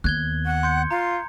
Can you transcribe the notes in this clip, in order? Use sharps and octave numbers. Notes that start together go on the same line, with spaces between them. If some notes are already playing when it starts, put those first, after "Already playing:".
D#2 B3 F#6 G#6 G7
F#5
C6 G6 C#7
F4 A#5